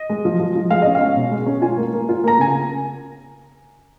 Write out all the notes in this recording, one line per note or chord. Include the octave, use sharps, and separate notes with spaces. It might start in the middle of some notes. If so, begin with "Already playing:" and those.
Already playing: D#5
G#3
F3
F3
F3
G#3 F5
C#4 D#5
F5
C#4
B2
G#3
C#4
F4 G#5
A#3
A#3
F4
A#3 A#5
C#3 G#5